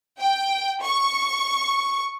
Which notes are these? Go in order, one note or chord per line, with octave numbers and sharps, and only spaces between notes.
G5
C#6